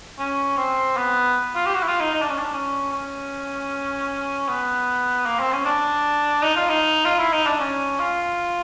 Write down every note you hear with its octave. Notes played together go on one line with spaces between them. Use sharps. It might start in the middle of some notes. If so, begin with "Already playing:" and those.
C#4
C4
B3
F4
G4
F#4
E4
F4
D#4
D#4
D4
C#4
D4
C#4
C#4
B3
A#3
C4
C#4
D4
D#4
F4
D#4
F4
E4
D#4
D4
C#4
F4